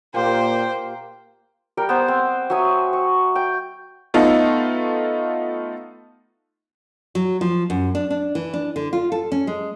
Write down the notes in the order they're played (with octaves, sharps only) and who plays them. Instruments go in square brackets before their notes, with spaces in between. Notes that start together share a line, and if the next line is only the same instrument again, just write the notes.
[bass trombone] A#2 [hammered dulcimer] A#3 F4 G4 [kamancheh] C5 [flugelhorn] G5
[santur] G3 A#4 G5
B3 C5
C4
F#3 E5 G#5 D#6
C#6
G5
[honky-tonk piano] A3 B3 D#4 F4 A4
[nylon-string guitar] F#3
F3
F#2
D4
D4
E3
D4
D3
F4
A4
C#4
G#3